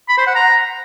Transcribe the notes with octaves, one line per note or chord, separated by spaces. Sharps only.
B5
C5
F#5
A#5